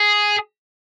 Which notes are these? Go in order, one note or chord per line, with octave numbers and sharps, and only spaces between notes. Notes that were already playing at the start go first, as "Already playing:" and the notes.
Already playing: G#4